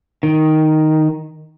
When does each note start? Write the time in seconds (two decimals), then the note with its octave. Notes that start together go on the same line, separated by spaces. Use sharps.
0.23 D#3